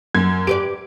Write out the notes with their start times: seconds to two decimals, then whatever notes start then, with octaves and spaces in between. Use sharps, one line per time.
0.15 F#2 G#6
0.47 G4 B4 D5 D7